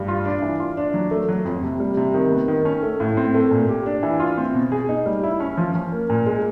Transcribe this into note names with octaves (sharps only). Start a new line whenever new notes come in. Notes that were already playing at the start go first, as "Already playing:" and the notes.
Already playing: G2
F4
D4
E3
F4
D4
F#3
A3
F#3
F2
C3
G3
C3
D#3
B3
D#3
C#4
A3
A2
C4
A3
A#2
G4
D4
E3
F4
C4
B2
G#4
D#4
G3
E4
C#4
F3
C#4
A#3
A#2
G#3